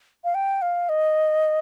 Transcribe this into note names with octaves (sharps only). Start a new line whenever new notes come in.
F5
G5
F5
D#5